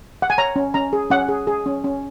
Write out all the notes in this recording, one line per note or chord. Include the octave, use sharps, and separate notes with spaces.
F#5
G#5
C#5 A#5
C#4
C#4 A#5
G#4
C#4 F#5
G#4
G#4
C#4
C#4